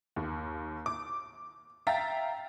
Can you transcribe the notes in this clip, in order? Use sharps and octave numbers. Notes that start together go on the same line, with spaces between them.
D#2
D6
E5 F5 G5 A#5 A6 B6